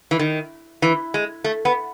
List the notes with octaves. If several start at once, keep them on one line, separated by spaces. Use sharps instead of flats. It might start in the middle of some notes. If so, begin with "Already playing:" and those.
E3
D#3
E3
G#3
A3
B3